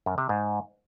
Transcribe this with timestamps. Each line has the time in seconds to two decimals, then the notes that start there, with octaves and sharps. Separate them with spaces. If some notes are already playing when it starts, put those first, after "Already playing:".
0.06 F#2
0.18 C3
0.29 G#2